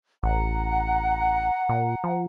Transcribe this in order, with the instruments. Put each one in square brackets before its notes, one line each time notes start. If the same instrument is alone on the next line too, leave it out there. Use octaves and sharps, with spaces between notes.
[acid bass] A1 [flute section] F#5 A#5
[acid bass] A#2
F3